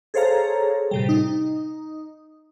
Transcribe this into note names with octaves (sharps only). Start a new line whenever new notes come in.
G#4 A4 C5 C#5 F5 A#5
A2 C3 G3
D#4